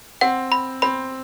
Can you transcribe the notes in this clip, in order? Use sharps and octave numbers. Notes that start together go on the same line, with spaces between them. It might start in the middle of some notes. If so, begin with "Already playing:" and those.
C4 F#5
B5
C4 B5